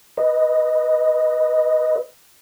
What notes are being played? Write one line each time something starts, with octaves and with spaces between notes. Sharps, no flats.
B4 D#5